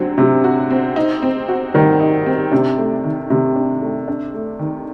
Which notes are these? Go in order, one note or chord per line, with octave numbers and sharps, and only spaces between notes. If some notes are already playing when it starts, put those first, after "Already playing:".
Already playing: D3 F#3 C4 F#4
C3 F#3
F#4
C4
D#4
C4
F#4
D#3 G3
D#4
C4
C3 D4
A3
D#3
C3 D#3
D4
A3
D4
A3
D#3